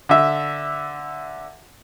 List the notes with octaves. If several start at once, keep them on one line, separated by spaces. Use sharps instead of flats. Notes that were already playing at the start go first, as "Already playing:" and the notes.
D3 E5